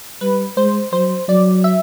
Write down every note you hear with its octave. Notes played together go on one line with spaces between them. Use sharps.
G3 B4
G#3 C5
F#3 C5
F#3 D5
E5